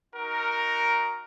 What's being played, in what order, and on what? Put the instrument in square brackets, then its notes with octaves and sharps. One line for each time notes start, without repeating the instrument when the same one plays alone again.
[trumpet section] D#4 F#4 A#4